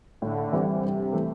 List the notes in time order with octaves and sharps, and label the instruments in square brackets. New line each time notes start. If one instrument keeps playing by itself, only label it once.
[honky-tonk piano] A2 [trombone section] D3
[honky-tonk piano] E3 G3 C4 E4
[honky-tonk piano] G2 [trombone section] C3
[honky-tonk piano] E3 A3